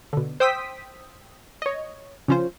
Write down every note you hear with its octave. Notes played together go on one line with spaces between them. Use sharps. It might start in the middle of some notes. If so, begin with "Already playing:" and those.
B2 D3
C5 G5 D#6 E6 B6
C#5 D#5
C#3 F3 C#4 F4 C5